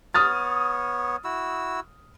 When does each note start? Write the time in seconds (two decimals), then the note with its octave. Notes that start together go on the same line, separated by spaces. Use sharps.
0.14 B3 C#5 D#6 F6 A6
1.24 E4 F#4 E6